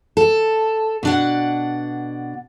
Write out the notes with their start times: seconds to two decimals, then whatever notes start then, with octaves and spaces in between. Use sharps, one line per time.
0.17 A4
1.03 B2 D4 F#5